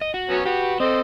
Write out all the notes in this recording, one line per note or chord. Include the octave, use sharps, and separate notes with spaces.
D#5
F#4
F#3 B3 C#4
F#4 G4 B4
C4 A4 C5 D#5